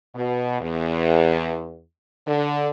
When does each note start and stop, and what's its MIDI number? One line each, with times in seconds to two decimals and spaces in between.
0.15 0.58 47
0.61 1.83 40
2.27 2.70 50